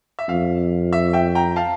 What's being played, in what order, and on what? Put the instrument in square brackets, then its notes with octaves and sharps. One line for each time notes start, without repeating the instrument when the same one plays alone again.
[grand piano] E5
[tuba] F2 [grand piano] F5
[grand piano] E5
E5 G5
G5 A#5
F5 A5